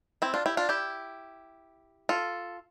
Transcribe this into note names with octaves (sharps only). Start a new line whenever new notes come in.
C4 E4
D4 F4
E4 G4
D4 F4
E4 G4
F4 A4